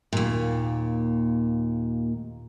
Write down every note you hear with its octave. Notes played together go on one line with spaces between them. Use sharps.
D#2 A#2